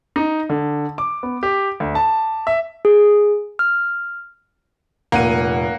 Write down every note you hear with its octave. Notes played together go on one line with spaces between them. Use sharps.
D#4
D3
D6
B3
G4
D2
A5
E5
G#4
F6
F1 A#2 A#3 F#5 D#7